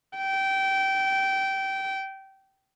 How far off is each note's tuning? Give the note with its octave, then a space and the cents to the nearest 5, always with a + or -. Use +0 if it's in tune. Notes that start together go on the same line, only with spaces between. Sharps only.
G5 -20